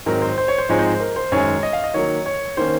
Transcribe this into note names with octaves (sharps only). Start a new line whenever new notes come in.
G#2 D#3 F#3 C4 D#4 A#4
C5
C5
C#5
C5
G#2 F3 G#3 C4 D#4 C#5
C5
A#4
C5
F#2 D#3 G#3 C#5
D#5
F5
D#5
D#3 F#3 A#3 C#5
C#5
D#3 A#3 C#4 C5